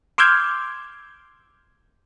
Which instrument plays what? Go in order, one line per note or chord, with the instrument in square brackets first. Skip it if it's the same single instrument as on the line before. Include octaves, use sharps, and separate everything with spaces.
[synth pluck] C6 D6 E6 F6 G6 G#6